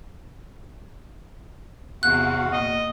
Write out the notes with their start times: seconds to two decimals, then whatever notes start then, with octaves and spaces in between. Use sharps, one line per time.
2.03 E2 C3 F#4 F5 F#5 F#6
2.53 A#2 D#5